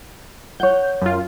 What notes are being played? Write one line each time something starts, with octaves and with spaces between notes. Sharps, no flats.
C#5 F#5 G6
F#2 F4